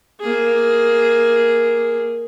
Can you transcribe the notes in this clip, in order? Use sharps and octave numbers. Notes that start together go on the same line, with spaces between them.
A#3 G#4